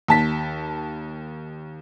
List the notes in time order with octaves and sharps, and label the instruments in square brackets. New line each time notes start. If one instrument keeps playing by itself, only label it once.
[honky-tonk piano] D#2 A5 B6